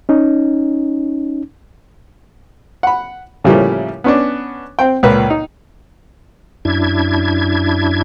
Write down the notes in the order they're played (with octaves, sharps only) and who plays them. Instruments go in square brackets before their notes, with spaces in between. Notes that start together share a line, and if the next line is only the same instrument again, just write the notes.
[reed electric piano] C#4 D#4
[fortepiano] F#5 B5
A2 C#3 F3 G3 A#3 E4
B3 C#4 D4
C4 G5
C#2 A#2 A#4 B4
D#4
[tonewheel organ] F#2 D4 E4 G#6